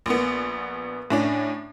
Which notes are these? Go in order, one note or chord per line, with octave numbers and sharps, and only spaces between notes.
A#1 B3
A2 C#4 D4